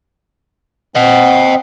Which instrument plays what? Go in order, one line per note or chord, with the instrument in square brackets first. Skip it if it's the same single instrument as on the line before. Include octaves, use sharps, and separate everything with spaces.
[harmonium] C4 [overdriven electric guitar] D#5 F#5